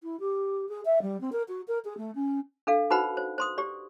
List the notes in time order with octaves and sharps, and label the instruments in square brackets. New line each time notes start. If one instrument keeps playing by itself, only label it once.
[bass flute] E4
G4
G#4
E5
G3
C4
A#4
F#4
A#4
G#4
A3
C#4
[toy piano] D4 A4 F5
D#4 F#4 B4 C5 F#5 B5
C5
C5 C6 D#6
G4 D5